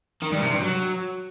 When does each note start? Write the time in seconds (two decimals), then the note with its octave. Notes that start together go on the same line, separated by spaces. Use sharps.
0.22 D#3
0.31 G2
0.41 C3
0.51 G2
0.60 F#3